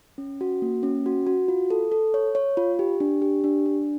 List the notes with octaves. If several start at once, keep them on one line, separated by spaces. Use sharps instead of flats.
C#4
F#4
A#3
C#4
F#4
F#4
F4
A4
A4
C#5
C#5
F4
G4
D4
G4
D4
D4